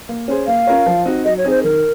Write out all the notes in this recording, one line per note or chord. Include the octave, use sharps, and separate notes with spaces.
A#3
C#4 G#4 C5
A#3 F5
C#4 F4 A#4 C#5
F3
C4 D#4 F#4
F#3 D#5
C#5
C4 D#4 G#4
C5
D#3 A#4